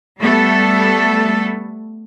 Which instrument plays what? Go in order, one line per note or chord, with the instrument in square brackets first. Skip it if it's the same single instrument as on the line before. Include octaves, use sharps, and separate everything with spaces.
[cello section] G3 A3 B3 A4